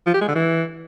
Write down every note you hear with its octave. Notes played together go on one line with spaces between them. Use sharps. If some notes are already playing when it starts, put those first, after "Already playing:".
F3
G4
G#3
D3
E3